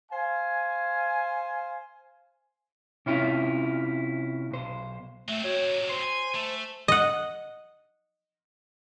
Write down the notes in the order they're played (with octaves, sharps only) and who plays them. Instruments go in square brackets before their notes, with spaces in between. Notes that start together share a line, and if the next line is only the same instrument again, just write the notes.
[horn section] C5 F5 G#5
[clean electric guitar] C3 C#4 E4 F4
B1 C5
[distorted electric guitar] F#3 C4 [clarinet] A3
[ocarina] F#4 [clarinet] C#5
[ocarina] C5 [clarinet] C6
[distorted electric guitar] G#5
A3
[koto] D#5 F#5